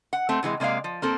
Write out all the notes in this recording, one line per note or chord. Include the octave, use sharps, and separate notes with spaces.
F#5
A3 C4
C3 E3 F#3 G#3
C3 G#3 A#3 D5 F5
F3
A#3 C4 A4